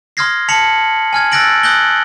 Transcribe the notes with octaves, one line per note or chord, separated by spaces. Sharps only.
C6 D#6 F6 G#6 A#6 C7
A5 B6 C#7 F7 F#7
G#5 F6 G#6
E6 F#6 A6 A#6 D7 F#7
D#6 F#6 G6 A#6 F#7 G7